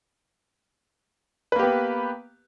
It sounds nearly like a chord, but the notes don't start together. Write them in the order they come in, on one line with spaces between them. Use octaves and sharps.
B4 A#3 G4 B3